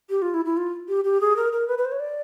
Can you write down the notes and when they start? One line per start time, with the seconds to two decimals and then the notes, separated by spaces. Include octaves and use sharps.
0.10 G4
0.22 F4
0.34 E4
0.45 E4
0.57 F4
0.88 G4
1.04 G4
1.21 G#4
1.36 A#4
1.52 A#4
1.68 B4
1.78 B4
1.85 C5
1.92 C#5
2.00 D5